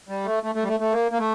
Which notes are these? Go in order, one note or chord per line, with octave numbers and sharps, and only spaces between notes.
G3
A3
A3
A3
G3
A3
A3
A#3
A#3
A3